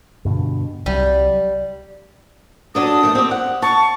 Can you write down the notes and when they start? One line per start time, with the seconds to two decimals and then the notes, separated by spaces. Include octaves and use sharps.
0.25 G2 B2 D3
0.86 C2 F#3 G3
2.75 F#3 D4 A4 D#6
3.03 D#3 F#3 A3
3.15 C4 G4
3.31 F#5
3.62 A5 C#6